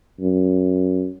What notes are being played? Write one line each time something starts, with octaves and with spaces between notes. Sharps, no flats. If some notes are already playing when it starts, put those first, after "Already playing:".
F#2